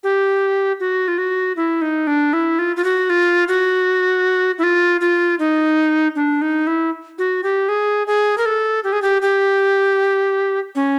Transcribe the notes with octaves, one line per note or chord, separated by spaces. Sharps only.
G4
F#4
F4
F#4
E4
D#4
D4
E4
F4
F4
F#4
F4
F#4
E4
F4
F4
D#4
D4
D#4
E4
F#4
G4
G#4
G#4
A#4
A4
G4
G#4
G4
G4
C#4